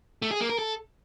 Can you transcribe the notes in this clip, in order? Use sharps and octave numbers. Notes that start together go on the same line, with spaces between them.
A3
G#4
A#3
A#4
A4